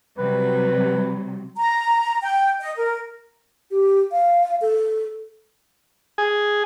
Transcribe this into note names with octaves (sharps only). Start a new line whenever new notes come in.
C3 F#3 G3 B4
A#5
G5
D#5
A#4
G4
F5
A4
G#4